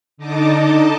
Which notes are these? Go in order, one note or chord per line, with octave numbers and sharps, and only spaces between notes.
D3 D#4 D#5 A5 D6